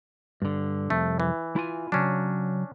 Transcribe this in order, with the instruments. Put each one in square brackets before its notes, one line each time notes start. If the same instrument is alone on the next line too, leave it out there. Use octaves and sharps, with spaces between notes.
[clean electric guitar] G2 D3
[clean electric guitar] C2 F2 [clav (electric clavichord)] A3
[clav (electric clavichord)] E3
[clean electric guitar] E4 F4 G#5
[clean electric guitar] C#3 F#3 [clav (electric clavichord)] C#4 D4